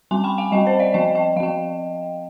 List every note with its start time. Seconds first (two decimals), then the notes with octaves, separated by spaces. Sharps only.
0.11 G3 C4 G#5 C6
0.24 G5 B5
0.38 F5 G#5
0.52 G3 C4 D#5 G5
0.66 C5 D#5
0.80 D5 F5
0.94 F3 C4 D#5 G5
1.15 D#5 G5
1.36 F3 F5
1.40 C4 G5